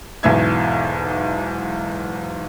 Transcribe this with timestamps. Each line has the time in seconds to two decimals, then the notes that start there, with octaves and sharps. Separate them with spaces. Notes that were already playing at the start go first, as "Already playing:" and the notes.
0.23 B1 E2 G#2 E5 G#6